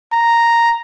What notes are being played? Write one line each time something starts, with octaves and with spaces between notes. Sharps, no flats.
A#5